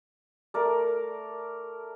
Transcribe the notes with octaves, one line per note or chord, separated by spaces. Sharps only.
A3 A#4 D5